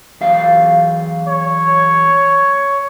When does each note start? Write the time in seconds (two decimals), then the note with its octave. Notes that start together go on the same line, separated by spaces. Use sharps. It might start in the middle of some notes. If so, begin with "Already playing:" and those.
0.21 E2 F#3 F5
1.27 C#5